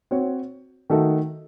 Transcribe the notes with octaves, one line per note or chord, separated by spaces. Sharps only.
C4 F#4 C#5
D#3 A3 D#4 F#4 A4